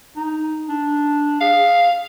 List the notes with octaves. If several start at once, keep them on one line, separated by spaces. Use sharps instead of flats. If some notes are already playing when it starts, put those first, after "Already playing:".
D#4
D4
G#4 F5